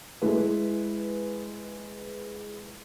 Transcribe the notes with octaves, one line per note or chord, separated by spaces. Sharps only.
G#3 E4 B4